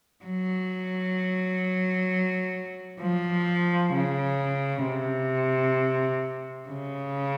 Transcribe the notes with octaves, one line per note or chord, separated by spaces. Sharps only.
F#3
F3
C#3
C3
C#3